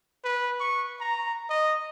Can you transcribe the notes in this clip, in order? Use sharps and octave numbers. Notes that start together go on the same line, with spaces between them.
B4
C#6
A#5
D#5